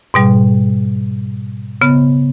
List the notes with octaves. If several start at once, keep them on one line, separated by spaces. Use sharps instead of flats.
G#2 B2 G3
C#3 B3